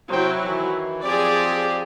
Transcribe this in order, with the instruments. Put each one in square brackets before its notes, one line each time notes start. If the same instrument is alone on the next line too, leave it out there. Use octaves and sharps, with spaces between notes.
[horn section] C3 C5 G5 [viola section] F#3 E4
[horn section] D#3 E3
[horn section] F3 C4 G4 [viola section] G#4 D5